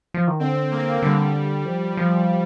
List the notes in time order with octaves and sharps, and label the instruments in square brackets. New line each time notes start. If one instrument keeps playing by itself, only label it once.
[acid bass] F3
D#3
[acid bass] D3 [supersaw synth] C4
[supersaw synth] A#3
[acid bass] D3 [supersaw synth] G3
[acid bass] F3
F3